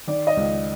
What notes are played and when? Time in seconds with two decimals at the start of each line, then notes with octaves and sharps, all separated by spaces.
0.07 D#3 D5
0.27 D#5
0.37 C#2